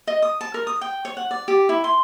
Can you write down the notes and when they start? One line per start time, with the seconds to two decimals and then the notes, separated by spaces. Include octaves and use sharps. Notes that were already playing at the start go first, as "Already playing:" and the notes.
0.07 D#5
0.22 D#6
0.41 A5
0.54 A#4
0.67 D#6
0.81 G5
1.05 C#5
1.17 F#5
1.31 D5
1.48 G4
1.69 E4
1.84 C6